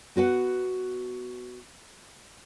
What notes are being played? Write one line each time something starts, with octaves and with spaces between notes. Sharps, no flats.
B3 F#4 B4 F#5